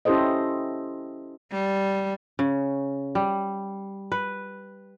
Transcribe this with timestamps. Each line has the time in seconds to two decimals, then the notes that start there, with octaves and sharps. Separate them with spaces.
0.05 C#4 E4 G4 A4 C5 D#5
1.52 G3
2.39 C#3
3.15 G3
4.12 B4